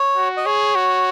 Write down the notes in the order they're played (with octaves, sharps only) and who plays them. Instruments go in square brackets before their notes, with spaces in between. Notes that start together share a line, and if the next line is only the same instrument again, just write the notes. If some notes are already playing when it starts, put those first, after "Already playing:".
Already playing: [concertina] C#5
[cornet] F#4
[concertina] D#5
[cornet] G#4 [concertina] C#5
[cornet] F#4